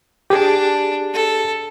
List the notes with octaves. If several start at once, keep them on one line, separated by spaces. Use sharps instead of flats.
D4 G4 G#4
A4